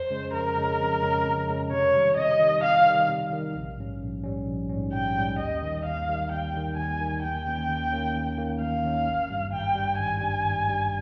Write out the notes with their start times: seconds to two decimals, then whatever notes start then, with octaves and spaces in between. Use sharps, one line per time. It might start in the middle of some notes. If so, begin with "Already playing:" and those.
Already playing: F2 C5
0.10 C#3 G#3 C#4
0.33 F2 A#4
0.56 C#3 G#3 C#4
0.80 F2
1.02 C#3 G#3 C#4
1.25 F2
1.48 C#3 G#3 C#4
1.71 C3 C#5
1.94 D#3 G3
2.17 C3 D#5
2.40 D#3
2.45 G3
2.63 C3 F5
2.86 D#3 G3
3.09 C3
3.31 D#3 G3
3.55 A#1
3.78 G#2 G3 C#4
4.01 A#1
4.24 G#2 G3 C#4
4.46 A#1
4.69 G#2 G3 C#4
4.93 A#1 G5
5.16 G#2 G3 C#4
5.38 D#2 D#5
5.63 D#3 G3
5.85 D#2 F5
6.08 D#3 G3
6.31 D#2 G5
6.54 D#3 G3
6.77 D#2 G#5
7.00 D#3 G3
7.23 D#2 G5
7.46 D#3 A#3 C#4
7.69 D#2
7.92 D#3 A#3 C#4
8.15 D#2
8.38 D#3 A#3 C#4
8.60 D#2 F5
8.84 D#3 A#3 C#4
9.07 G#1
9.30 G2 G3
9.53 G#1 G5
9.75 G2 G3
9.99 G#1 G#5
10.21 G2 G3
10.45 G#1
10.68 G2 G3